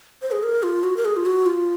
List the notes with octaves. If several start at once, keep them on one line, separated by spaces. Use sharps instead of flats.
C5
G#4
A#4
F4
F#4
A#4
G#4
F4
F#4
F4